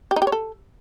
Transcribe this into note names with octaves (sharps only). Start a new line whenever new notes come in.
G4
D#4
G4
C#5
A4